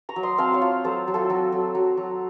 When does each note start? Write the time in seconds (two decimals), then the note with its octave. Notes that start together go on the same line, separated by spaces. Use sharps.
0.09 A#5 C#6
0.16 F#3
0.23 C6 D#6
0.38 C4 F5 A5
0.53 C#5 F5
0.61 F4
0.84 F#3 A4 C5
1.08 F#3
1.14 F4 A4
1.30 F#3 F#4
1.52 F#3
1.75 F#3
1.97 F#3